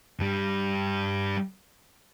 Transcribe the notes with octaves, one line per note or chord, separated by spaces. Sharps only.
G2 G3